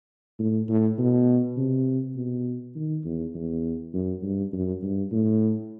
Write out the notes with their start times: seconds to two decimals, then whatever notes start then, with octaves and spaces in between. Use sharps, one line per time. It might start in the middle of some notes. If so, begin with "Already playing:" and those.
0.39 A2
0.68 A2
0.98 B2
1.57 C3
2.16 B2
2.75 D#3
3.05 E2
3.35 E2
3.93 F#2
4.23 G2
4.53 F#2
4.82 G2
5.12 A2